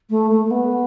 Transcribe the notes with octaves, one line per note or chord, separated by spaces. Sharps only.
A3
A3
A3
B3